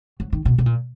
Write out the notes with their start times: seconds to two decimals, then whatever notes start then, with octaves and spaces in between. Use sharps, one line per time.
0.20 F#3
0.33 D#3
0.45 B2
0.58 B2
0.66 A#2